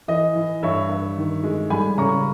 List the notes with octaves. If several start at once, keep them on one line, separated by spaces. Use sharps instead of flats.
E3 D#5
E3
G2 C#5 E5
G2
D#3
G#3
G3 G#5 B5
C#3 A#5 C#6